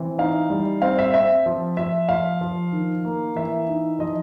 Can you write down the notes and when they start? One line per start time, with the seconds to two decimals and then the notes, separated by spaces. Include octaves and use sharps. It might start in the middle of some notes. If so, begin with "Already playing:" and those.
Already playing: E3 C4
0.18 D#4 F5
0.50 G3
0.82 C4 F5
0.99 E5
1.14 C4 E5
1.46 F3
1.77 F3 E5
2.09 F3 F5
2.41 F3
2.73 D#3
3.05 A#3
3.36 E3 E5
3.68 D#4
3.99 F3 D#5